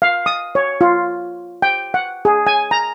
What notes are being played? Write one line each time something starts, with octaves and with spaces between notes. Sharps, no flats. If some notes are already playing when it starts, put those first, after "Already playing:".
F5
D#6
C#5
F4
G5
F#5
G#4
G#5
A#5